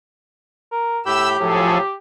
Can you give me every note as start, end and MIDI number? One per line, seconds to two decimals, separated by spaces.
0.72 0.99 70
1.06 1.37 45
1.06 1.94 67
1.06 1.37 83
1.06 1.29 88
1.06 1.37 91
1.39 1.81 45
1.39 1.77 53
1.39 1.81 54
1.39 1.77 68
1.39 1.77 69